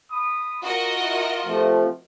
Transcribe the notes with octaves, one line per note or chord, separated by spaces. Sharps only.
B5 D#6
F4 F#4 A#4 D#5
E4
C3 F3 A3